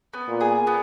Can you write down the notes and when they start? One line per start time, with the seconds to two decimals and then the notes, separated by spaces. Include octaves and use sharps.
0.14 B3
0.28 A#2
0.41 G#4
0.67 B3